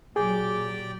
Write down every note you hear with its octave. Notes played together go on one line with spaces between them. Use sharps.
A#2 F#3 G4 G#4 D5 G5